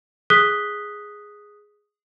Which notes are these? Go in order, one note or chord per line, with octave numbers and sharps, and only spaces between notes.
G#4 D#6 F#6 B6 G7